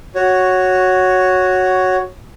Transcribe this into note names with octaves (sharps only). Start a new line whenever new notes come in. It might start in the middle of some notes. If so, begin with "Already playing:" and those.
F#4 C#5